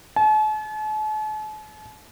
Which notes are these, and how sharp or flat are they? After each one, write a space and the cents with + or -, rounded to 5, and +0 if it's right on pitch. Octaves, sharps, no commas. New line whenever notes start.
A5 -45